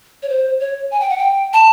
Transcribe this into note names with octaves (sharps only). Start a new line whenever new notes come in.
C#5
C5
C#5
G#5
G5
F#5
G5
A5